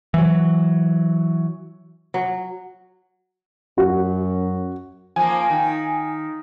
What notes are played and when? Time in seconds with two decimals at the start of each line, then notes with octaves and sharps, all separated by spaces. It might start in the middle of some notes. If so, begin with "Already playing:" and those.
0.14 E3 F#3
2.14 F#3
3.78 F#2 F#4
5.16 F3 A#3 G#5
5.50 D#3